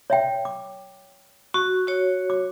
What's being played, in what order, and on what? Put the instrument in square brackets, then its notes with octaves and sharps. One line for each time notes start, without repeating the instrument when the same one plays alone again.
[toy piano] C#5 E5 G5
D6
[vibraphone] F#4 [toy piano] C#6
[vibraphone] F#4 C#5
[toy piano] D6